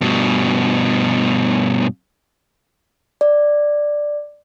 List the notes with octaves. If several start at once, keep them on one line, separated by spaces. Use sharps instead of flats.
G2 B2
D5